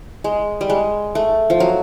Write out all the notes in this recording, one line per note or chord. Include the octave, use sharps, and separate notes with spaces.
G#3
G3
G#3
A3
F3
F#3